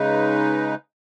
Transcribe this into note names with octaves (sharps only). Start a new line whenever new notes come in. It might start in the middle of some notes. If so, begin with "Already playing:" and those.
Already playing: C#3 G#3 D#4 B4